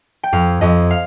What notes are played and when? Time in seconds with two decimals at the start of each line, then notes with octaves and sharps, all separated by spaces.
0.24 G5
0.32 F2 F5
0.61 F2 D#5
0.91 F5